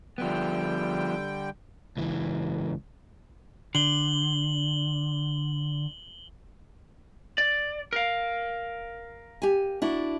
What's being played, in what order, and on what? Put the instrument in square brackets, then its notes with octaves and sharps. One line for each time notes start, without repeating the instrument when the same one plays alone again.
[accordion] D3 G3 G5 [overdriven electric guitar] F3 B3
[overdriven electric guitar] C#2 E3
[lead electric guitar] D3 [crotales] F#7 G7
[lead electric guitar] D5
A#4 F5
[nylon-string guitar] G4 G#5
D4 E4 F#4